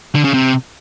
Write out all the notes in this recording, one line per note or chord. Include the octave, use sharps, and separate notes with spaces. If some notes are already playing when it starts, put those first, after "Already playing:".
D3
C#3
C3